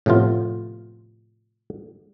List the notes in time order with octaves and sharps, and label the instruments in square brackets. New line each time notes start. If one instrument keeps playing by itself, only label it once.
[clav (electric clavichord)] A2 C3 F3 B3 F4